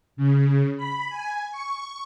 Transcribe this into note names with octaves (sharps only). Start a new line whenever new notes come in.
C#3
B5
G#5
C#6